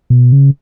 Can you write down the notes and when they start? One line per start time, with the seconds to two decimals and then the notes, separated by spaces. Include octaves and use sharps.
0.10 B2
0.32 C#3